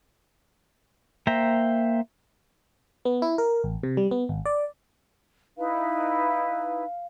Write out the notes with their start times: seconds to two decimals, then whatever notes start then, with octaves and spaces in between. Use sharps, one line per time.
1.27 A#3 C5 E5 G5 A#5
3.05 B3
3.22 E4
3.38 A#4
3.64 A1
3.83 C3
3.97 G3
4.11 B3
4.29 G#1
4.46 D5
5.58 D#4 E4 B4 F5